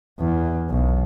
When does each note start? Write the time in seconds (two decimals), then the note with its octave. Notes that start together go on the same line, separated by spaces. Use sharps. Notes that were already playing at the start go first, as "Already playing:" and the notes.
0.19 E2
0.70 B1